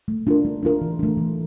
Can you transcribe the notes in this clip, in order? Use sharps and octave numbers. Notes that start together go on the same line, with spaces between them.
A3
D4 F4 A#4
A3
D4 F4 A#4
E3
A3 D4
E3